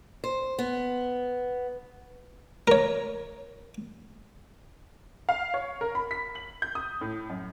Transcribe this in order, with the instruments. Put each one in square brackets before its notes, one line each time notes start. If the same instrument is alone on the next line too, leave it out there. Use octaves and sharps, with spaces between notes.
[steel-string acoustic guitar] C5
B3
[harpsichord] A#4 C#5
[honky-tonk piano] F5
C#5
A#4
B5
B6
F#7
G6
D#6
A2
F#2